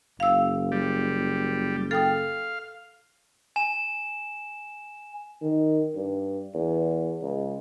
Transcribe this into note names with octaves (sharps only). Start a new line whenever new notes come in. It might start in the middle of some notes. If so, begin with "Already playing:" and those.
F#1 F5 E6
G3
A4 F5 G5 D#6
G#5 E7
D#3
G2
E2
C#2